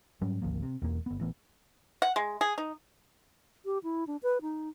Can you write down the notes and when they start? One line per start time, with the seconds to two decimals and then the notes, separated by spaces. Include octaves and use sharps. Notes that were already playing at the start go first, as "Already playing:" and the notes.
0.21 G#2 F#3 G3 C#4
0.42 G#1 D2 F3 A#3
0.62 C3
0.82 E1 E2 A#3
1.06 G1 B3
1.20 A1 E3 B3
2.02 F#5
2.16 G#3
2.41 G#4
2.58 D#4
3.65 G4
3.83 E4
4.07 D4
4.23 B4
4.42 D#4